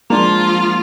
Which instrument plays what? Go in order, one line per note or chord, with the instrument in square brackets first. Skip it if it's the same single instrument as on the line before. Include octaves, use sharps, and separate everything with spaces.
[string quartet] F3 F4 [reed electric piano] G#3 D4 [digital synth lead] A#3